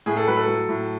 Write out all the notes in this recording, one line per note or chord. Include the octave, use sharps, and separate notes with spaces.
A2 G#4
A4
F#3 B4
A4
F#3
A2